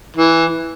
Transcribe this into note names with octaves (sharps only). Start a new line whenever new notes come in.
E3